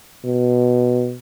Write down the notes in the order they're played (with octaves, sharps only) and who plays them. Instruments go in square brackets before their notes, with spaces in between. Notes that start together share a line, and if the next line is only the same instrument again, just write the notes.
[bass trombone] B2